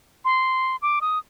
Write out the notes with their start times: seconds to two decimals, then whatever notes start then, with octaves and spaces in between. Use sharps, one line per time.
0.25 C6
0.82 D6
1.01 D#6